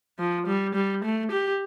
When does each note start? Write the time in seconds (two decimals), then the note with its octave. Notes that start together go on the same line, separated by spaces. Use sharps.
0.19 F3
0.47 G3
0.75 G3
1.04 A3
1.31 G4